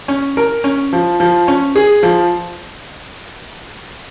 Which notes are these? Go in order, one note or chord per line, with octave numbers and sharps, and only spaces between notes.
C#4
A#4
C#4
F3
F3
C#4
G#4
F3